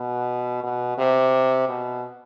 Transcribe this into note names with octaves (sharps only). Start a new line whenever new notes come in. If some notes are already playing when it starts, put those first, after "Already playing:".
Already playing: B2
B2
C3
B2